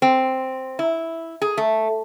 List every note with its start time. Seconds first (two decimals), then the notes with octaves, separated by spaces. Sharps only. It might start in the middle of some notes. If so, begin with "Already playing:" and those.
0.02 C4
0.79 E4
1.42 G#4
1.57 A3